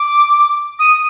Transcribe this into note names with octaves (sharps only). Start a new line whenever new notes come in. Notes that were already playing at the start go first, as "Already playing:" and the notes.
Already playing: D6
D#6